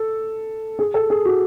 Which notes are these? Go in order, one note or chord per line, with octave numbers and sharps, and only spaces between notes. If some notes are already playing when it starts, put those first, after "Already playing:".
Already playing: A4
G#4
A4
G#4
F#4